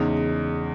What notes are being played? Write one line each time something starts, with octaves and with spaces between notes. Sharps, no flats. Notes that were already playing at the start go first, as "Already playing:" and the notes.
Already playing: E2 C#3 G#3 D#4